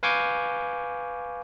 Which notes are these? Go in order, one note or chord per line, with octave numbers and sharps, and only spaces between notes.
B4 F5 G#5 C#6 D6 G6